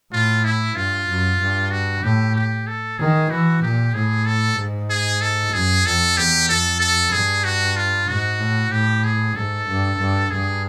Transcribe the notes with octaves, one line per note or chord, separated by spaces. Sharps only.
A2 F4
E4
G2 F4
F#2
G2
F#4
A2 G4
G4
A4
D#3 G#4
E3 F#4
A#2 G4
A2 G#4
A4
G#2
G#4
A4
F#2 G#4
F2 A4
E2 G4
F2 A4
A4
G2 G#4
F#4
F4
G#2 F#4
A2
A2 G4
G#4
G#2 A4
G2
G2
G2 G#4